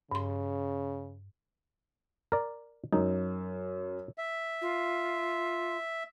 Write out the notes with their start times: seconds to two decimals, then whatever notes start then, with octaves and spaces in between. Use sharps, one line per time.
0.11 G2 C#3 C6
2.32 A#4 D5
2.93 F#2 D#4
4.18 E5
4.61 F4